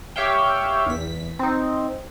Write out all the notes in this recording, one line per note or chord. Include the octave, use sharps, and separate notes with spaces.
G4 C#5 E5 F5 G5
E2 B6
C4 D#4